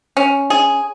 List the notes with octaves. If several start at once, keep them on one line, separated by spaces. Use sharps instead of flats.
C#4
G#4